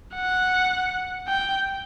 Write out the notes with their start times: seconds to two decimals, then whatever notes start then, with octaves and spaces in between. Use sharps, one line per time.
0.15 F#5
1.28 G5